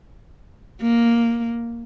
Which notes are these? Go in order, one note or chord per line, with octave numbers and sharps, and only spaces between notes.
A#3